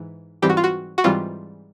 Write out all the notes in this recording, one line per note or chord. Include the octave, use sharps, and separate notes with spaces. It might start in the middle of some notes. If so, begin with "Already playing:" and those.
Already playing: G#2 E3
G#2 E3 G3 C4 G4
F#4
F4
F#4
F#4
G#2 E3 G3 C4 F4